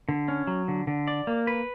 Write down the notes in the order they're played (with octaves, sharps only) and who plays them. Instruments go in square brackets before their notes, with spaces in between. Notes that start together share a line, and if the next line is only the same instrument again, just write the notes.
[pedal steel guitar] D3
C#4
F#3
D3
D3
D5
A#3
B4